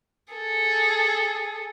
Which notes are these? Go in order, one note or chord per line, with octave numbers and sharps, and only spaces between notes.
G#4 A4